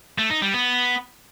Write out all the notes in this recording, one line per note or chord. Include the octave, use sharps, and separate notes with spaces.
A3
D#4
G3
B3